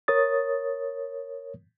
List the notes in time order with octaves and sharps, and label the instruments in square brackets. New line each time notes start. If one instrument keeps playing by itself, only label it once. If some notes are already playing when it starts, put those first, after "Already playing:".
[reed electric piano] A#4 C#5 D#6 A6